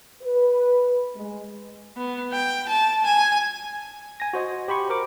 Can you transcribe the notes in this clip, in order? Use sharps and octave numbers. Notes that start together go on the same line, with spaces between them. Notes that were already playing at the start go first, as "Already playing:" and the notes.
B4
G#3
B3
G5
A5
G#5
G#5 A#6
F#4 C5 D#5
G4 C5 B5 C#6
A#4 D6